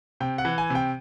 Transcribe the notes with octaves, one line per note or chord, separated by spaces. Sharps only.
C3 G5
F#5
E3
G#5
C3 G5